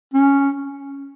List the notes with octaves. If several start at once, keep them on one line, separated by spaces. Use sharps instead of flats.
C#4